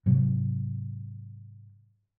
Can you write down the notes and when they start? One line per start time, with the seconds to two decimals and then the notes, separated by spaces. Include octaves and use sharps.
0.06 G#2 C3 F#3